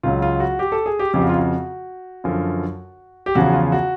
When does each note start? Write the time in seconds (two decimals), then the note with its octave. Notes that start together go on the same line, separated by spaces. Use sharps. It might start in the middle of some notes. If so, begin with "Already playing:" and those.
0.03 C#2 C#3 F#3 F4
0.22 F4
0.40 F#4
0.59 G4
0.72 A4
0.86 G#4
0.99 G4
1.14 F2 C#3 F3 G4
1.21 F#4
1.29 F4
1.36 F#4
2.24 F#2 D3 F3
3.26 G4
3.35 E2 C#3 F3 F#4
3.53 F4
3.72 F#4